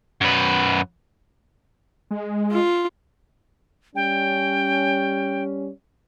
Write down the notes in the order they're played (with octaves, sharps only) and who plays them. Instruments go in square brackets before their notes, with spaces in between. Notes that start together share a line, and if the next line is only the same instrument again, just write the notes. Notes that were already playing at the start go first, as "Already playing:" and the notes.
[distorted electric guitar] F#2 B4
[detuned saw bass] G#3
[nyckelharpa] F4
[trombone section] G3 C#4 [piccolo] G5